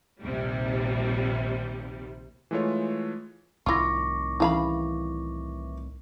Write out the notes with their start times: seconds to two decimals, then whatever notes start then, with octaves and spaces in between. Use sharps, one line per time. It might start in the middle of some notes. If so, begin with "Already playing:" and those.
0.21 A#1 D#2 C3 G3
2.51 E3 G#3 A3 F4 C#5
3.66 C2 A2 D#3 E4 F4 C#6 D6 A#6
4.40 C#3 E3 F5 B5